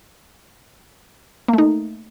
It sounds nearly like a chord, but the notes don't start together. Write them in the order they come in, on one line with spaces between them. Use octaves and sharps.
A#3 A3 D#4